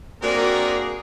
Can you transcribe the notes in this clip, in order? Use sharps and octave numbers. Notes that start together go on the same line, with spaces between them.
A#3 C4 D4 F#4 G#4 A#4